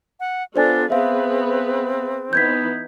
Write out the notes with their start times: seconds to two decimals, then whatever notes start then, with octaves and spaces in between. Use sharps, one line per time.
0.20 F#5
0.56 B3 D4 F4 A4 C5 D5 G#5
0.90 B3 C4 G#4 B4 E5 F5
2.33 E3 B3 D#4 G6 G#6 B6